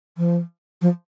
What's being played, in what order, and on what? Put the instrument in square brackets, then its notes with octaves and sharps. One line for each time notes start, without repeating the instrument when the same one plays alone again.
[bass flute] F3
F3